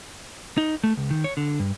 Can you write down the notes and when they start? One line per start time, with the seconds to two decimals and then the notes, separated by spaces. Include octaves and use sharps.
0.58 D#4
0.84 A3
0.97 C#2
1.11 D#3
1.24 C#5
1.37 D3
1.60 G2